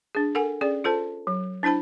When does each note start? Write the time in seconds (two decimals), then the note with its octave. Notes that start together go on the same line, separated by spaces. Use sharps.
0.15 D4 G#4
0.35 A4 A#4 F#5 G#5
0.61 C#4 G#4 D5
0.84 F4 A4 C5 A5
1.27 F#3
1.63 D4 E4 C5 A5 B5